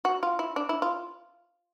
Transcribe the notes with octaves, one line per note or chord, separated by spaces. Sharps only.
F#4
F4
E4
D4
E4
F4